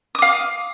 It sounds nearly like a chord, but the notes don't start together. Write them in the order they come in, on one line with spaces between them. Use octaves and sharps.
D#6 D6 F5